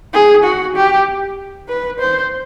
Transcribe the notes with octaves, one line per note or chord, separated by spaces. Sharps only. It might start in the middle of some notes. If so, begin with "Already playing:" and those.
G#4
F#4
G4
B4
C5